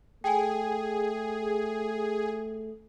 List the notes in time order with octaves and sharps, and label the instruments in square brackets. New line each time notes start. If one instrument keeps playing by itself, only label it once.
[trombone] A3 [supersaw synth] G#4 [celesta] G5 G#5